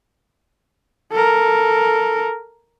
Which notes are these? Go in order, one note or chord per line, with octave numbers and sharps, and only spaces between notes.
A4 A#4